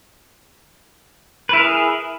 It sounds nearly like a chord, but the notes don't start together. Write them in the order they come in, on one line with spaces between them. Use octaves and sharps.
B4 E4 A#4 G#4